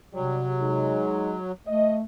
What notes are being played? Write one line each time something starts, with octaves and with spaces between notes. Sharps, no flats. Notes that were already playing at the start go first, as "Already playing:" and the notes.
G2 C3 F#3 G3
G#3 D#4
A3 D#5